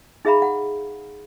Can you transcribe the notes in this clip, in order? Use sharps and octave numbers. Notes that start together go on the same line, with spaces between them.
D#4 G#4 E5 F5 A#5 B5
F#5